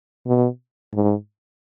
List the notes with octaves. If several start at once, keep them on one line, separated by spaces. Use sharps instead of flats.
B2
G#2